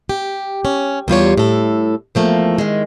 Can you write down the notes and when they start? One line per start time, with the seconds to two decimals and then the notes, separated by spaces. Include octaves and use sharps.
0.09 G4
0.65 C#4
1.08 E2 G3 F4 C#5
1.38 A2 A4
2.15 E2 F3 A3 A#3
2.58 D#3 G#3